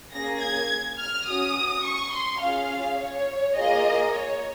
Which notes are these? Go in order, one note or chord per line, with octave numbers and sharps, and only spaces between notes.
A#3 C#4 G#4 A#6
G#6
F6
C#4 F#4 D#6
C#6
C6
C#4 F4 G#4 F5
C#5
A#3 F4 G#4 D#5
C#5